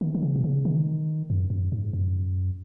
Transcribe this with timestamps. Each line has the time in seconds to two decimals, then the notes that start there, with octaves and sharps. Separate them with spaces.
0.01 D#3
0.15 D#3
0.23 C#3
0.36 B2
0.44 C#3
0.65 D#3
1.30 F#2
1.50 F#2
1.72 G#2
1.93 F#2